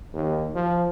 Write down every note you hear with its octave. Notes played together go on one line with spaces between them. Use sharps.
D#2
F3